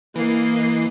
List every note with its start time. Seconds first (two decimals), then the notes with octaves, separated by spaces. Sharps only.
0.16 E3 A#3 D#5 C7